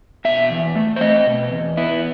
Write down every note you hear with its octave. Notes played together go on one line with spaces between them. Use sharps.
B2 E5
E2
A3
C5
C4 D#5
B2
E2
B3 E4